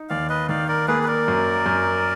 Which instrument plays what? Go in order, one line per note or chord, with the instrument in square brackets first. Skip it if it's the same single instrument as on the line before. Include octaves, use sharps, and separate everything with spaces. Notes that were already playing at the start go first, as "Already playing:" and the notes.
Already playing: [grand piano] D#4
[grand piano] D#2 [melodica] D5 F5
[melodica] B4 D#5
[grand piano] D#3 [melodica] D5 F5
[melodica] A#4 D5
[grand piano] A#3 [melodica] G#4 B4
[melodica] B4
A#4 D5
[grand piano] F#2
F#2